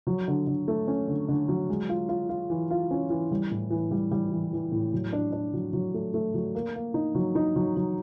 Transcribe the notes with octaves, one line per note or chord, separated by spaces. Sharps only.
F#3
D3
D3
A3
C#4
D3
D3
F#3
G#3
F4
F4
F4
E3
F4
C#4
E3
G3
A2
E3
G3
G3
E3
E3
A2
F#3
D4
D4
F#3
F#3
A3
A3
F#3
A#3
A#3
D#4
F#3
D#4
F#3
F#3